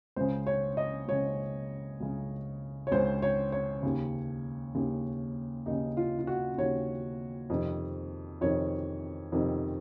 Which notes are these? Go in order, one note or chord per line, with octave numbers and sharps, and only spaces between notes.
C#2 C#3 C5
C#5
D#5
C#2 C#3 C#5
C#2 C#3
C#5
C#2 C#3 C5
C#5
C#5
D#2 C#3
D#2 C#3
D#2 C#3 D#4
F4
F4
F#4
D#2 C#3 C#5
F2 C3 D#3
F2 C3 D#3 C#5
F2 C3 D#3